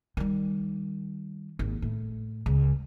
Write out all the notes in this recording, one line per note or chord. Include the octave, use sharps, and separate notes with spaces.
D#3 G3
G#1 D#2
A2
C#2